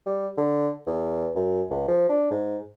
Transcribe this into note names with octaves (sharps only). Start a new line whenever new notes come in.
G3
D3
E2
F#2
C#2
F3
D4
G#2